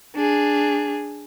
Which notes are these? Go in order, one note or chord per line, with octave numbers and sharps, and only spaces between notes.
D4 G#4